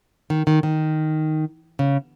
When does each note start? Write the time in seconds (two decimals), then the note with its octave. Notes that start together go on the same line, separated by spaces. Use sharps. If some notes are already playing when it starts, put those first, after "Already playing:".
0.30 D#3
0.47 D#3
0.63 D#3
1.79 C#3